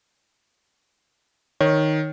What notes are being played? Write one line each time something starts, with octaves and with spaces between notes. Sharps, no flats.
D#3 C#5